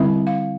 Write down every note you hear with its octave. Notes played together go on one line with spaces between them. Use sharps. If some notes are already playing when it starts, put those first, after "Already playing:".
Already playing: D3 G3 C4 E4 E5
F5